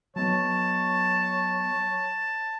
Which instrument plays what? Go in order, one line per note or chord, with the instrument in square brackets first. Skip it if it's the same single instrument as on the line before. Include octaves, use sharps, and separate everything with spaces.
[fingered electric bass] F#3 B3 [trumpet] C#5 [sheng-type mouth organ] A5